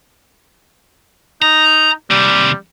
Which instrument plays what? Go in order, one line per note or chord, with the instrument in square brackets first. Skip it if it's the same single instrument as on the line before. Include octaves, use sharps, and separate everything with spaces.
[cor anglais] D#4 [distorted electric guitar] A#5
[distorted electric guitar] D#2 C3 [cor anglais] G3